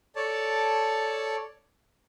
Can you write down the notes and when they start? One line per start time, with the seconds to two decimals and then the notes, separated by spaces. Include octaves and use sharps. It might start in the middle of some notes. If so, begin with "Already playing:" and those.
0.16 A4 C#5 D5 A5